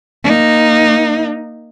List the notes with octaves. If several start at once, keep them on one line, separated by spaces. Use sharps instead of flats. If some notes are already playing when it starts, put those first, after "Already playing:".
A#3 D#4